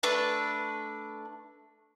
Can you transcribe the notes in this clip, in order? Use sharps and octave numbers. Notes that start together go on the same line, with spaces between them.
A3 D4 B4 A5